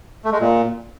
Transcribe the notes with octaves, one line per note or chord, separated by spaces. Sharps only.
A3
G#3
A#2